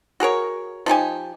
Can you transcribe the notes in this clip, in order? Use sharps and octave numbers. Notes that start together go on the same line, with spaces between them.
F#4 G#4 A#4 C#5
F3 D#4 G4 G#5